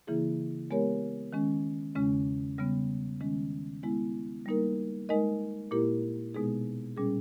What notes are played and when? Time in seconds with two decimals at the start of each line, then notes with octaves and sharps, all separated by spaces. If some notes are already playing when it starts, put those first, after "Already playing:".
0.07 C#3 E3 A#3 E4 G#4
0.71 G#3 B3 G4 A#4 C#5
1.33 D#3 G#3 C#4
1.95 E2 C#3 G#3 C#4
2.58 C#3 G3 B3
3.21 D#3 G#3 C#4
3.83 G#3 B3 E4
4.46 G3 A#3 D#4 A#4
5.09 G#3 D#4 A#4 D#5
5.71 A#2 A#3 E4 G4 A#4
6.34 B2 G#3 B3 D#4 G#4
6.97 A#2 G3 C#4 G#4